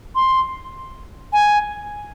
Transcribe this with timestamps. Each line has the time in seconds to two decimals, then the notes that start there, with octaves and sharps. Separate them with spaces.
0.15 C6
1.33 G#5